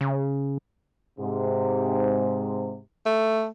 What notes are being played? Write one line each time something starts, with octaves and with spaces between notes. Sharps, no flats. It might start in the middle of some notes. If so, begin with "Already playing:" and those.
C#3
G#2 C3
A3